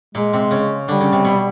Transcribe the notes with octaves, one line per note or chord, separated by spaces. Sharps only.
A#2 G#3 A#3
C3 C4
C#3 C#4
D3 G3 D4
C#3 C#4
C3 C4
B2 B3